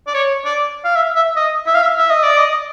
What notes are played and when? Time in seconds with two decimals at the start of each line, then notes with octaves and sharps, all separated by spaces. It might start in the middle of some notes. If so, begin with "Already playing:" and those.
0.07 D5
0.14 C#5
0.45 D5
0.85 F5
0.95 E5
1.15 E5
1.36 D#5
1.67 E5
1.75 F5
1.83 E5
1.98 E5
2.10 D#5
2.23 D5
2.38 D#5